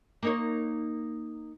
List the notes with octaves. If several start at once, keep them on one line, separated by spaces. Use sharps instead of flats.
A#3 D#4 C#5